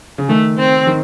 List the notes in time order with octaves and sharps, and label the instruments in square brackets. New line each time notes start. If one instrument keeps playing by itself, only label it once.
[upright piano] C#3
[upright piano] D#3 [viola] A3
[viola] C4
[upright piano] D#3